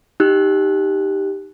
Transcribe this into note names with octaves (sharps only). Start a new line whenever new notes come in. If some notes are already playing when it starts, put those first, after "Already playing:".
D#4 G4 F#6